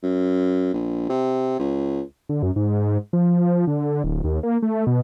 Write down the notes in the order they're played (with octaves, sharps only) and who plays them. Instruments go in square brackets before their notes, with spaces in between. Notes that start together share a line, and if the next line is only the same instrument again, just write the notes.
[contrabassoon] F#2
A#1
C3
C#2
[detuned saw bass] D3
F#2
G#2
F3
D3
D1
D#2
A#3
A3
B2